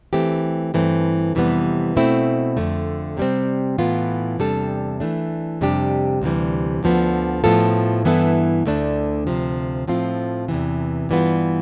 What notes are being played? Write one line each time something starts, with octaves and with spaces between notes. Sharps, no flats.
E3 A3 C4 G4
G2 E3 A3 C4
F2 C3 E3 G3 B3
B2 A3 C4 E4
F2 D3 A3
C3 G3 C4
A2 E3 B3 F4
E2 C3 G3 D4 A4
E3 A3 D4
F2 C3 G3 D4 G4
D2 C3 E3 G3
D2 D3 F3 B3
A2 F3 B3 F4 A4
G2 E3 B3 E4 A4
D2 D3 A3 D4
D2 C3 F3
A2 F3 C4 F4
E2 C3 E3
G2 E3 G3 B3 F4